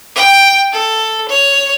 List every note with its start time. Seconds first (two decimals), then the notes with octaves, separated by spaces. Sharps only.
0.15 G5
0.73 A4
1.29 C#5